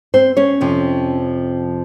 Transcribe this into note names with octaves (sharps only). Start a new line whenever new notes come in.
C4 C5
C#4 C#5
F2 C3 F3